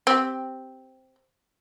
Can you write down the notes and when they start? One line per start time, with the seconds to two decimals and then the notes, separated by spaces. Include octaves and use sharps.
0.07 C4 G4